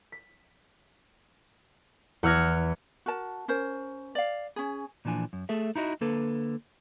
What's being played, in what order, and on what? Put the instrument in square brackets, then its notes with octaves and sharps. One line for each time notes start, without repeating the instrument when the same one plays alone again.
[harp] B6
E2 F#5 E6 F6 G#6 A#6
[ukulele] F#4 A#4 A5
C#4 A#4 C5
D5 F5
C#4 G#4
[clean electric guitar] A#2 E3 F3 D4 G#5
F#2
A3 G#4 A4 E5
D#4 E4 F#4 D#5
D3 A#3 A4 B4